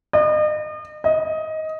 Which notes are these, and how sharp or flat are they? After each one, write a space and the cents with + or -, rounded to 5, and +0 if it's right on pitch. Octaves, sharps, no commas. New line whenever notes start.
D#5 -40
D#5 +15